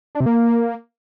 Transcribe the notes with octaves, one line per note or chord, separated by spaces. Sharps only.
D4
C3
A#3